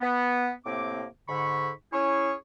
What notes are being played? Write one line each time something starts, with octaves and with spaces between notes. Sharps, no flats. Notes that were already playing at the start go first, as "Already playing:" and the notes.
B3
A2 C3 A#3 C4 D6
G#2 D3 B5 C#6
C#4 E4 G#4 C#5